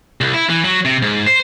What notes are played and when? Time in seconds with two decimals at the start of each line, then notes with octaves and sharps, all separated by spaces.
0.21 C2
0.34 E4
0.49 E3
0.64 F#3
0.85 C3
1.02 G#2
1.26 C5